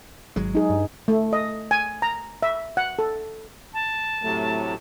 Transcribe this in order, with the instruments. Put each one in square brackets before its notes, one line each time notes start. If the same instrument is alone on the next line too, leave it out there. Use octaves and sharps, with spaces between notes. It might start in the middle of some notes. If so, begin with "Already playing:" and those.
[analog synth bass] G#1 [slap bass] F#3 G#3
[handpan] D#4 G#4
[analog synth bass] G2
[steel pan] A3
D#5
G#5
A#5
E5
F#5
A4
[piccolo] A5
[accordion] A2 C3 F#3 [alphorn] A3